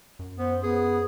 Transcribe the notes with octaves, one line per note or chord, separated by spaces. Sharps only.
F#2
B3 C5
B3 G#4